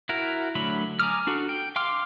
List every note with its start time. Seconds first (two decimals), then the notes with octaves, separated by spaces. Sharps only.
0.09 E4 F#4 A#4
0.55 D3 F#3 A3 B5
0.99 G#5 A#5 D6 D#6 F6
1.27 D4 F#4 A4
1.49 G5
1.76 F5 G5 C6 D6 F6